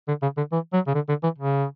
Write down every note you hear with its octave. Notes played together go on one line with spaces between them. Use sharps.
D3
C#3
D3
E3
F#3
C#3
D3
D3
E3
C#3